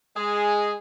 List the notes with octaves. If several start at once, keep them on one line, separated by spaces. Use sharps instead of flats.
G#3 G#4